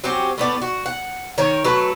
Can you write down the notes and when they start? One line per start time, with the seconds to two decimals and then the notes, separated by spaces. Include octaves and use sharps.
0.04 F#3 C4 C#4 G4
0.38 A2 B3 D5
0.62 F#4
0.86 F#5
1.38 D#3 A#4 C#5
1.64 F#3 A3 B4